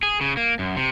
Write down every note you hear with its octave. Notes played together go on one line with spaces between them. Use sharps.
G#4
C#3
A#3
F#2
C3